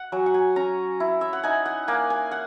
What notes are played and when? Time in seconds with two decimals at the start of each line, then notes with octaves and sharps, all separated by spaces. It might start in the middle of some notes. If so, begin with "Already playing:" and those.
Already playing: F#5
0.12 F#3 G#5
0.26 F#5
0.34 G#5
0.56 C#4 A#5
1.00 E4
1.21 E5
1.33 F#5
1.43 D#4 G#5
1.66 F#5
1.88 A#3 G#5
2.10 G#5
2.31 F#5